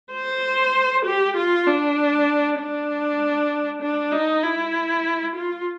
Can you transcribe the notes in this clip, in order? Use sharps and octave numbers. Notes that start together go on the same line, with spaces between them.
C5
G4
F4
D4
D4
D4
D#4
E4
F4